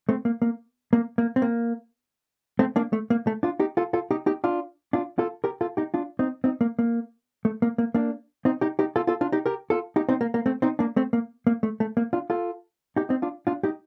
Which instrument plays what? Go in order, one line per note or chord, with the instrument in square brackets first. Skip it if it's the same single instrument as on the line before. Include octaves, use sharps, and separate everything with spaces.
[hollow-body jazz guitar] A3 C4
A#3
A#3
A#3
A#3
C4
A#3
A3 C4
A#3 D4
A3
A#3
A3
D4 F4
D#4 G4
F4 A4
F4 A4
D#4 G4
D#4 G4
D4 F4
D4 F4
F4 A4
G4 A#4
F4 A4
D#4 G4
D4 F4
C4 D#4
C4 D#4
A#3
A#3
A3
A#3
A#3
A#3 D4
C4 D#4
D#4 G4
D#4 G4
F4 A4
F4 A4
D4 F4
D#4 G4
G4 A#4
F4 A4
D#4 G4
C4 D#4
A#3
A#3
A3 C4
C4 D#4
A#3 D4
A3 C4
A#3
A#3
A3
A3
A#3
D4 F4
F4 A4
D#4 G4
C4 D#4
D4 F4
D4 F4
D#4 G4